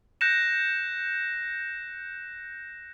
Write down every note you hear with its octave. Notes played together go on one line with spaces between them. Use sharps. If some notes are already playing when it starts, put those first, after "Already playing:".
F#6 G6 A#6 C#7 E7